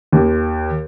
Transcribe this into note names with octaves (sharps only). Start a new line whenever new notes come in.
D#2